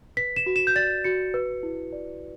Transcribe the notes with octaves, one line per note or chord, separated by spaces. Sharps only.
B4 B6
E7
F#4
E7
G6
D5 A6
F#4 C#7
B4
E4
D5